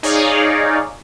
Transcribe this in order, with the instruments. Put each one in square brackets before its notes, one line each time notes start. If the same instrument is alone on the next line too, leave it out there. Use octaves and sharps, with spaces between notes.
[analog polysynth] D#4 G#4 C#5 D5 F5